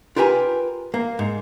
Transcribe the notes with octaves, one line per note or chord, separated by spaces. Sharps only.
F4 G4 A#4 B4 G#5 A#5
A#3
G#2